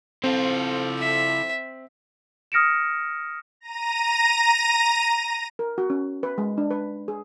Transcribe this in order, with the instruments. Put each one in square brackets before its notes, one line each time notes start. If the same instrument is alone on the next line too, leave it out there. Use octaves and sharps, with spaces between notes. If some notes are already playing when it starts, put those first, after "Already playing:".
[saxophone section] F3 A4 [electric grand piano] C4 [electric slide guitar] E4 C5
[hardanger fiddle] E5
[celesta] D#6 F6 A#6 C#7 D7 E7
[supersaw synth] A#5 A#6 D#7
[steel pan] A#4
F#4
C#4
B4
G#3
D4
B4
G#4